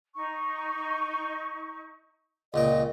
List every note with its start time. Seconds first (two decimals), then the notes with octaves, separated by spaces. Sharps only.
0.15 D#4 C#6
2.54 C#2 A#2 D#5 G5